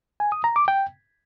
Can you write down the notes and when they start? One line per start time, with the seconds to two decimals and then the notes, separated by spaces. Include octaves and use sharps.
0.20 G#5
0.32 D#6
0.44 A#5
0.56 D6
0.68 G5